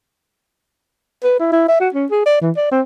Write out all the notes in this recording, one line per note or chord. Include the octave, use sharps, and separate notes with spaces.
B4
E4
E4
E5
F#4
C#4
G#4
D5
E3
D5
C4